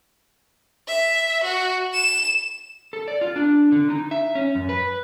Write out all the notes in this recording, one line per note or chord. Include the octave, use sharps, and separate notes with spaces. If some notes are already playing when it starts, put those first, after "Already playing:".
E5
F#4
E7
A4
D5
F4
D4
D3
D#4
E5
C#4
F#2
B4